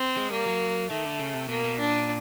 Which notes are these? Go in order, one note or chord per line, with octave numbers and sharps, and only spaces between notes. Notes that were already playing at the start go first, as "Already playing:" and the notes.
Already playing: C4
G#3
G3 A#3
F#3
D#3 A3
D3
C#3
C3
B2 A#3
B2
A#2 D4